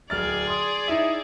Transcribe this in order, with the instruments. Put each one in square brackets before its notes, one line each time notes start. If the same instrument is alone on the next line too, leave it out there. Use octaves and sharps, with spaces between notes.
[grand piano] D1 F6 A6 [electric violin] G#4 D5
[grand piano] C6 D#6
D#4 E4 E5